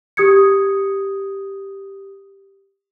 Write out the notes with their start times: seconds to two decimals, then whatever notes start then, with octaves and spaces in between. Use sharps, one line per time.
0.17 G4 D#6 G#6 C#7